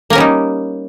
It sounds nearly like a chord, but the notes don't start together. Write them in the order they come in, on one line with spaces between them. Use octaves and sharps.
A#3 A#4 C#4 G3 D#4